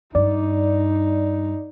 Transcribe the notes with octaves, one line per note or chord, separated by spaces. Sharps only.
G2 D#4 D5